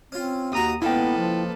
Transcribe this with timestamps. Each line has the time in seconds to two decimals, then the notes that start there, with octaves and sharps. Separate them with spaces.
0.12 C4 C#4 F4
0.52 D#2 F#4 A#5 D#6
0.82 C#2 A#3 B3 E4 A4 B4 G5
1.18 F3